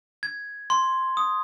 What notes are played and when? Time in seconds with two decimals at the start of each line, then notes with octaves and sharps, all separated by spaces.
0.23 G#6
0.70 C6
1.17 D#6